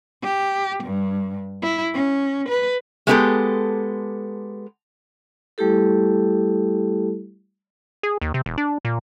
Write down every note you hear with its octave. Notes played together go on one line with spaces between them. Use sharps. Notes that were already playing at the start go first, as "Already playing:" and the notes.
G4
G2
E4
C#4
B4
G#3 A3 B3 D#4 G4 A4
G3 A3 E4 G4 A4
G#4
D#2
C3
E1
D4
A#2